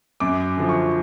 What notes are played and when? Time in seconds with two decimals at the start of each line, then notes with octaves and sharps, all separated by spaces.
0.20 F#2 D6
0.57 D3 F3
0.69 C#6